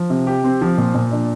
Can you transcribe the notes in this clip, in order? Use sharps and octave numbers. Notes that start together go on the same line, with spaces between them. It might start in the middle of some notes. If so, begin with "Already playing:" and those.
Already playing: F3
C3
G4
C4
F3
A#2
A#2
D4